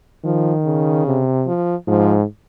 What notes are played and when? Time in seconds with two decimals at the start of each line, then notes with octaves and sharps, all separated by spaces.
0.25 D#3 F3
0.65 C#3
1.07 C3
1.47 F3
1.87 G#2 F3